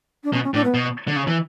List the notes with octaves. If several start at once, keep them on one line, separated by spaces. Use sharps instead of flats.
D4
B2 C#4
C#4
A2 D4
B3
B2
D3
C#3
E3